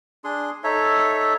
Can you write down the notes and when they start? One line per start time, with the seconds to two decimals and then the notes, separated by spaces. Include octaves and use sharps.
0.24 D4 G#4 C6
0.64 D#4 A4 C#5 E5